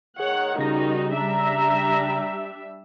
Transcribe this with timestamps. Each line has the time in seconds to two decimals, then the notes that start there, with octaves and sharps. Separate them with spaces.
0.20 D#3 G#4 C#5 F#5
0.58 C#3 G3 D#4 F#4 A#6
1.15 G3 D4 E5 A#5